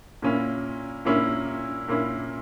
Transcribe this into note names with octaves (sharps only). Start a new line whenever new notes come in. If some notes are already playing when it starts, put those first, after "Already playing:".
A#2 A#3 C#4 E4
A#2 A#3 C#4 E4
A#2 A#3 C#4 E4